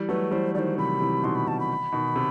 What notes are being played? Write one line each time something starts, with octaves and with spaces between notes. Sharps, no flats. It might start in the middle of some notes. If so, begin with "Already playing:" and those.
Already playing: E3 G3
F#3 A3 B4
E3 G3 C5
D#3 F#3 C5 D5
C3 E3 B5
C3 E3
B2 D#3 C6
B5
B2 A5
B5
B2 D#3
C3